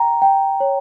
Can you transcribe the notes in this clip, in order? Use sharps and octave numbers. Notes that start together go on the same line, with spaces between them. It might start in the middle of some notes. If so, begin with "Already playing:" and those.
Already playing: G5 A#5
G5
C#5